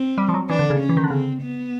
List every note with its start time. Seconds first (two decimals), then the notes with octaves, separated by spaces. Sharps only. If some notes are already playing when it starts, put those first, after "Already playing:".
Already playing: C4
0.18 G3
0.29 F3
0.34 F#3
0.50 E3 D4
0.59 D3
0.70 C#3
0.80 C#4
0.89 E3
0.97 D#3
1.04 D3
1.10 C#3 C4
1.42 B3